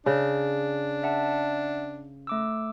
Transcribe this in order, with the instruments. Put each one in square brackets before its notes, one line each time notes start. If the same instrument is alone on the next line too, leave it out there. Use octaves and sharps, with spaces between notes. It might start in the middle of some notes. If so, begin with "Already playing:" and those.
[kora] C#3 [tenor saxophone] D4
[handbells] E5 F#5 A5
A3 D6 E6